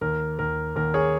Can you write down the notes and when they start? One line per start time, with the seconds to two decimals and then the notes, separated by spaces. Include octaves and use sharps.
0.01 D#2 A#4
0.39 D#2 A#4
0.76 D#2 A#4
0.94 G#4 C#5